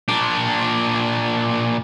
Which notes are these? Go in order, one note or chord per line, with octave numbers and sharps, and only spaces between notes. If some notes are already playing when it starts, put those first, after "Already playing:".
A#2 D4